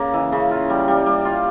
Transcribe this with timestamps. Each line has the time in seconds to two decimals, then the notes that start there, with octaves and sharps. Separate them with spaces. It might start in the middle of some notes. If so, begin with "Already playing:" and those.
Already playing: C#3 A#3
0.14 E3
0.32 C#3
0.51 F4
0.70 G3
0.88 G3
1.06 G3
1.25 F4